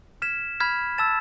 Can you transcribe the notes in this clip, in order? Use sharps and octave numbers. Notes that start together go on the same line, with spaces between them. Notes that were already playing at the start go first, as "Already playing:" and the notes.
F6 G#6 B6 E7
B5 F6 G#6 B6
A5 E6 A6 E7